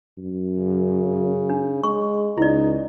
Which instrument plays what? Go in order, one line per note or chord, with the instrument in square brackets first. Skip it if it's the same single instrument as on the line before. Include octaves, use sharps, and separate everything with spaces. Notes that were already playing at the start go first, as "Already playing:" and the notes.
[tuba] F#2
[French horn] C#3
[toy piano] D4
[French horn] G#3 [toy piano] C#6
[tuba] C#2 [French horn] D#4 [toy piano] E4 D5